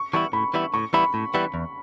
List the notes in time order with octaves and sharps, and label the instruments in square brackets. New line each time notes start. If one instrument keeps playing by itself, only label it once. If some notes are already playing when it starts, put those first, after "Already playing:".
Already playing: [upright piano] C#6
[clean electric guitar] E3 G3 B3 E4 [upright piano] C#6
[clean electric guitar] A2 [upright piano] B5
[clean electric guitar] E3 G3 B3 E4
[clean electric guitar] A2 [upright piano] C#6
[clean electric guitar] E3 G3 B3 E4 [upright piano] B5
[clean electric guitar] A2
E3 G3 B3 E4
E2